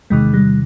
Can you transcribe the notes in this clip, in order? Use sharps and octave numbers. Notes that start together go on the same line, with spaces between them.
E2 C3 D#3 G#3
G3